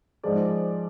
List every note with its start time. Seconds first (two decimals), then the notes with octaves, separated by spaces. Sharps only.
0.24 G#2 F3 G#3 D5